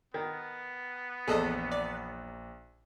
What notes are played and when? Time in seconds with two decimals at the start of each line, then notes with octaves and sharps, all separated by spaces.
0.14 D#3 B3
1.28 A#1 E2 G#4 A4 C5 D#5
1.72 D5